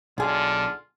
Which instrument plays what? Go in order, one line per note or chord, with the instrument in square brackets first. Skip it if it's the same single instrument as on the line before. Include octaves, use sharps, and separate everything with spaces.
[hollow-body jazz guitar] B1 G#4 [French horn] D3 [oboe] F4